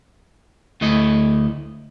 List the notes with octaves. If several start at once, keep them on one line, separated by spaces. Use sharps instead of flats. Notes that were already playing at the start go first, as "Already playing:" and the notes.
D2 A3 E4 D#5